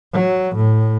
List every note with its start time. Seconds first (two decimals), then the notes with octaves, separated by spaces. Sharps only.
0.13 F#3
0.56 A2